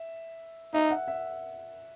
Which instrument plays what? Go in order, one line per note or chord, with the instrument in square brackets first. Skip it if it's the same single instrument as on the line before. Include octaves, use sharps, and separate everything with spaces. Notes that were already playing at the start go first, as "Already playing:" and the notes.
Already playing: [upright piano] E5
[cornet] D#4 [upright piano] E5
[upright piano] F#5
E5